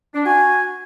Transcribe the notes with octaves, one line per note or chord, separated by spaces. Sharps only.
D4
F#4 G#5